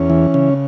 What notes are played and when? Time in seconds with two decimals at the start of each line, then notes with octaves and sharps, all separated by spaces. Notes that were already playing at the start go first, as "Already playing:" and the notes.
Already playing: E2 C#4
0.10 E3
0.34 C#3